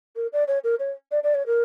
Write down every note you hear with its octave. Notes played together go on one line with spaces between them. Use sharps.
A#4
D5
C#5
A#4
C#5
D5
D5
C#5
A#4